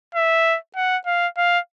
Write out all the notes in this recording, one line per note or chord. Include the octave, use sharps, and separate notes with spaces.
E5
F#5
F5
F5